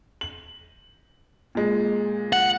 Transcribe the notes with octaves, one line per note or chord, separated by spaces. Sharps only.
F#7
A#2 G#3
F#5